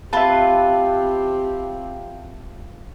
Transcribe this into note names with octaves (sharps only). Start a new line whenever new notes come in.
C4 F4 G4 B4 E5 A5